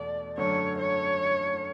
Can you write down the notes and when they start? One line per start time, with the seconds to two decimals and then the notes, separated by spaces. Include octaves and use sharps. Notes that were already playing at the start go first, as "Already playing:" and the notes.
Already playing: E2 B2 A3 D5
0.38 F#2 D3 F#3 A3 C#5
0.79 C#5